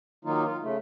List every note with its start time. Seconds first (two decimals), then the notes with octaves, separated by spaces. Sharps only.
0.25 D#3 F#3 A#3 D#4 F4
0.45 F4
0.62 C#3 A3